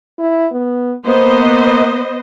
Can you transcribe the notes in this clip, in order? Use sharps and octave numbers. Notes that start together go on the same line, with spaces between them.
E4
B3
A#3 B3 C5 D#5